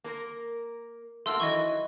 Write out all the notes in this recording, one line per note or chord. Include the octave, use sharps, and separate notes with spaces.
A#3 A#4
A3 A#3 F#4 C6 E6
D#3 E3 F#3 D#5 C#6